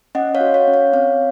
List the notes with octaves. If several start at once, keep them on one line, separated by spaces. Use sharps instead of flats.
C#4 D#5 F#5
C#5 F5
F#4
C#5 F5
C#4
C#5 F5
C4 C#5 F5